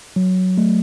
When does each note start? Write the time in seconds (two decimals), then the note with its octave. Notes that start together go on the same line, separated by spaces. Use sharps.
0.16 F#3
0.58 A3